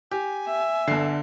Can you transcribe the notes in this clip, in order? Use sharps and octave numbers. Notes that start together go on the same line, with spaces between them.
G4 G#5
E5
G1 D3 C7